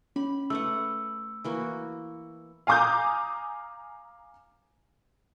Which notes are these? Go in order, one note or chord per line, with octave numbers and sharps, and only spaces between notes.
C#4 B5
A3 B4 F#5 E6
E3 A#3 F#4
F5 G#5 A#5 D6 D#6 G6